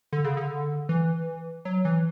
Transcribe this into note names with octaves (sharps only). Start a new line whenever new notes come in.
D3
C#3
D3
E3
F#3
E3